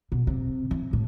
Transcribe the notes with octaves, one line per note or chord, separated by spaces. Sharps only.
B2
C3
E3
A2